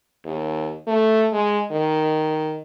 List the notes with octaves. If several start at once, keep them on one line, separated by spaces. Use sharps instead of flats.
D#2
A3
G#3
D#3